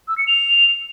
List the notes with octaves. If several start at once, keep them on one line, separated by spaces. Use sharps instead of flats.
E6
C#7
F7